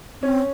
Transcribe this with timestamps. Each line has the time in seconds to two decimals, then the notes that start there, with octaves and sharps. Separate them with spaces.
0.22 C4 C#4